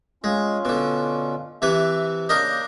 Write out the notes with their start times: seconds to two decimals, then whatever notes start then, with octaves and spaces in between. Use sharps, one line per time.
0.24 G#3 C#4 F4
0.65 B2 D3
1.62 C3 E3 B4 E5
2.29 C#3 A#3 D4 A#4 D#5 G6